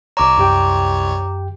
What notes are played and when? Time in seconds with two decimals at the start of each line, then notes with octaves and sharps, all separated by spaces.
0.17 C2 C#5 A#5 D6
0.38 F#2 G4 G5